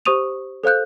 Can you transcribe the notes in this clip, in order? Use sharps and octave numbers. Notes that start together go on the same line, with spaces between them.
G4 C5 C#6 D#6 D#7 F7
A4 C5 F5 F#6 G6